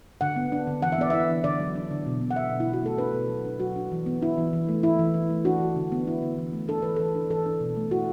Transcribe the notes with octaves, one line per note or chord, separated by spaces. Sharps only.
D3 F#5
B3
D4
D3
E3 F#5
E5
B3 D5
E4 E5
E3
D3 D5
F#3
D4
D3
B2
B3
F#5
D4 E5
B2
E4
B2
F#4
A3 A4
D4 B4
B2
F#3
D4
F#3 F#4
D4
E3
B3
D4 E4
E3
E3
A3
E4
E3
E3
A3
D4 F#4
E3
D3
B3
E4
D3
E3
A3
D4 A4
E3 B4
E3 A4
D4
E3 A4
D4
B2
A3
E4 F#4